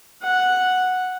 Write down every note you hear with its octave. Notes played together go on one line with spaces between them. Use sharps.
F#5